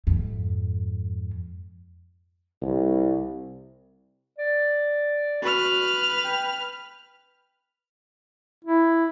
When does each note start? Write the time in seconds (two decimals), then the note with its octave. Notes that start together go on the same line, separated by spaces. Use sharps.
0.07 F2 G#2
2.62 C2
4.38 D5
5.42 F#4 B4 F6
6.24 G5
8.65 E4